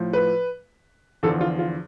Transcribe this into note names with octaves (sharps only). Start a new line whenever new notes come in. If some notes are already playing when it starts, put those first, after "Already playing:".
Already playing: A2 F3
B4
E2 D3 F3 A4
F4
F4